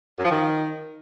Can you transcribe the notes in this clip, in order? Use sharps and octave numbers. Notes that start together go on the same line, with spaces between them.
F#2
F3
D#3